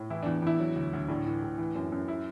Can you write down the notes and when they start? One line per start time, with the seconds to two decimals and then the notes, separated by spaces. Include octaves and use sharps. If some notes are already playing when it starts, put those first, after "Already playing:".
Already playing: A2
0.10 E3 E4
0.23 E2 D4
0.42 E2 E4
0.60 F#3
0.76 D2
0.93 D2
1.08 A2 D4
1.26 E3
1.43 A2
1.58 E3
1.75 F#2
1.92 F#2
2.08 E4